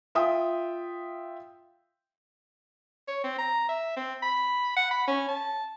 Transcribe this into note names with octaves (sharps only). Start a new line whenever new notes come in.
F4 E5 G5 D#6
C#5
C4
A#5
E5
C4
B5
F#5
B5
C#4
A5